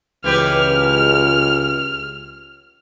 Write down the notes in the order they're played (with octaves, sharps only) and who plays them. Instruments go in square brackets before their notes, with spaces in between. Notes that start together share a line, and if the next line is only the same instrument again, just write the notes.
[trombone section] C#2 [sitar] E3 G4 B4 [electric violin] F6